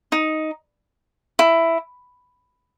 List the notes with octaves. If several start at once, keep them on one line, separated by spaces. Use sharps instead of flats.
D#4
E4